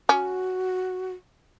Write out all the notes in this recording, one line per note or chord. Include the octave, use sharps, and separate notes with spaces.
C#4 F#4